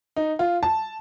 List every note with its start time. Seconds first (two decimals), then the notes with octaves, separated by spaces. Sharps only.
0.16 D#4
0.39 F4
0.63 A5